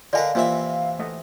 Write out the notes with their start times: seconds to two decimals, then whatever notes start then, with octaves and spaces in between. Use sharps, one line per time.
0.13 D3 A#4 B4 D5 D#5 F5 G#5
0.35 C3 E3 A#3 F4 E5
0.99 A3 D#5 F#5